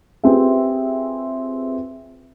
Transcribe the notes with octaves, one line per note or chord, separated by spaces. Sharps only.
C4 F4 G4 G#4 B4 E5